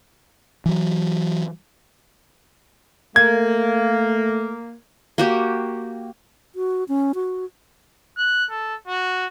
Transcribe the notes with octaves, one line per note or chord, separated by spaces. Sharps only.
E3 F#3
A3 A#3 G#6
A#3 F#4 G4
F#4
C#4
F#4
F#6
A4
F#4